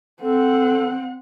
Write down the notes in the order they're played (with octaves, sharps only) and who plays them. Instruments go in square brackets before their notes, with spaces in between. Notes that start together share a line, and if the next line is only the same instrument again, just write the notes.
[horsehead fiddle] C4 F#5 [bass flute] A4